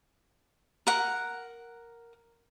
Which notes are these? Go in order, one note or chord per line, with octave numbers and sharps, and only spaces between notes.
A#4 F#5